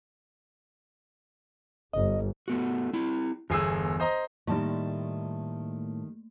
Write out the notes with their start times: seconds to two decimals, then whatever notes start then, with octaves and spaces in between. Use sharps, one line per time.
1.93 G1 D#5
2.48 A3 B3 F#4
2.93 C4 E4
3.50 G1 E2 G#4 G#5 E6
4.00 C5 D#5 A#5
4.47 A2 D#3 G3 A3 A#3 D#4 A5